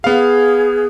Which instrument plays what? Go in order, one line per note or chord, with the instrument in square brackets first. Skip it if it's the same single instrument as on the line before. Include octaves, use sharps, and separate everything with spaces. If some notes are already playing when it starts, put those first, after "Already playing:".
[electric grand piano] B3 F5 [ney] G#4